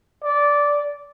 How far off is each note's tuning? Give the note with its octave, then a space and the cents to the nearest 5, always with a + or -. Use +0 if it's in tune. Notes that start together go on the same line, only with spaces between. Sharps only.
D5 -10